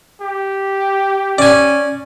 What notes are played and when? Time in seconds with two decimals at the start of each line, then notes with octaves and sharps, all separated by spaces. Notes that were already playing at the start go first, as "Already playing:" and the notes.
0.21 G4
1.38 C#4 D5 G#5